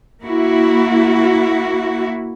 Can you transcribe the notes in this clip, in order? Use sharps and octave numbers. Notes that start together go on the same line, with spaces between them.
A#3 E4 F#4